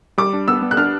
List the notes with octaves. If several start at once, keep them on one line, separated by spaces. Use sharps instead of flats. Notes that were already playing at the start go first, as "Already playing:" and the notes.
G3 D6
D4
B3 E6
B3
F#6
D4 F6